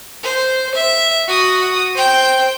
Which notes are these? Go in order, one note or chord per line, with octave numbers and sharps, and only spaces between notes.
C5
E5
F#4 D#6
C5 G5